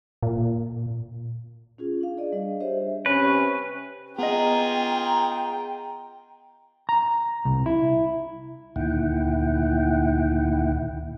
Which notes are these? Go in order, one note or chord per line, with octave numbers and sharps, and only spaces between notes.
A#2
C#4 F4 G#4
D4 F5
G#4 D5 D#5
G3 D4 D#5
G4 C5 C#5 D#5 E5
C3 C#4 B4
B3 F4 G#4 D#5 G5 A#5
A#5
C2
E4
D2 A#2 D#3 E4 F#5 G5